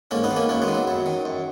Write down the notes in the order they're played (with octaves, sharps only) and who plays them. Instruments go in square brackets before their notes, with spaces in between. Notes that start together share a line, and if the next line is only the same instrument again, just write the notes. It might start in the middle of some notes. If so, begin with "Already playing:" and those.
[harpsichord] G#2 A#3 C#4
B3 D#4
D#3
A#3 C#4
F#2 A#3 C#4
G#3 B3
D#3
F#3
F#2 F#3
D#3
F#2